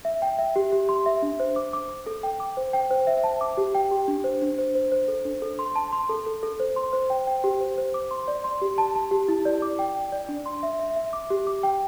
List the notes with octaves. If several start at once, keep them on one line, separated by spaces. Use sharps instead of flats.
E5
G5
E5
G4
G4
C6
E5
D4
C5
D6
D6
D6
A4
G5
D6
C5
G5
C5
E5
A5
D6
G4
G5
G4
D4
C5
D4
C5
C5
C5
A4
D4
A4
C6
A5
C6
A4
A4
A4
C5
C6
C5
G5
G5
G4
C5
C5
D6
C6
D5
C6
G4
A5
A5
G4
E4
D5
D6
G5
G5
D5
D4
C6
E5
E5
E5
D6
G4
D6
G5